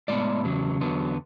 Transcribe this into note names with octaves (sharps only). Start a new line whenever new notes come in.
A2 G#3 B3 D5
E2 C#3 F#3
E2 D3 F#3 B3